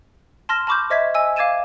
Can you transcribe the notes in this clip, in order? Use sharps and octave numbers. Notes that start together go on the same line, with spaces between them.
A5 C6 F6 A#6 E7
A5 B5 C#6 D6 F6 G6
C5 D#5 E5 G#6 B6
D#5 G#5 E6
F5 D6 G#6 A6 D#7 E7